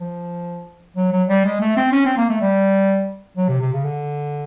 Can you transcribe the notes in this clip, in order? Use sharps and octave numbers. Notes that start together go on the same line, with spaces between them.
F3
F#3
F#3
G3
G#3
A3
C4
C#4
C4
A#3
A3
G3
F#3
C3
C3
C#3
D3